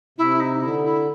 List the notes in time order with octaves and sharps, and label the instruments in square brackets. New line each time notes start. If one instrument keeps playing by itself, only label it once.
[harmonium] C3 [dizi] E4
[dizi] D#4
[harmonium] D3 [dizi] E4
[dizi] E4